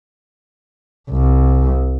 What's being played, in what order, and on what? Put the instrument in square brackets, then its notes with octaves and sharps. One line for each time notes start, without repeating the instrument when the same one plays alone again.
[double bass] C2